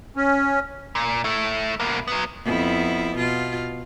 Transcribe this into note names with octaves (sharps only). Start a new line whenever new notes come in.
C#4
A#2
A3 E4
B2 A#3
F#3 B3
F2 B3 E4
B2 F4